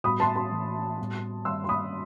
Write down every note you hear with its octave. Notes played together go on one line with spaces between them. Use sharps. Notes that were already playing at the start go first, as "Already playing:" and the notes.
A2 G3 B3 F#4 B5 D#6
A5 C6
A5 C6
A2 E3 A3
A2 G3 B3 F#4
G2 D#3 G3 C4 C6 E6
C6
B5 D#6